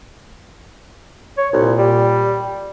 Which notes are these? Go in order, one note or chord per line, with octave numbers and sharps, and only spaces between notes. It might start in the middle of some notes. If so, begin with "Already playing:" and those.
C#5
C2 A#2
G3